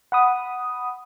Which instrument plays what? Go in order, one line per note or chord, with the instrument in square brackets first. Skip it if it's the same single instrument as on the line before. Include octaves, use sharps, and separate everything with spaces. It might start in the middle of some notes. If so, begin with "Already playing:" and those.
[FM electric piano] F#5 B5 D#6